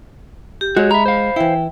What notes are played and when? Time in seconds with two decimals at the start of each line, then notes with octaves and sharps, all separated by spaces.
0.61 G4
0.77 G#3 F#4 C#5
0.91 E5 A#5 B5
1.06 C5 F5
1.36 E3 E4 G5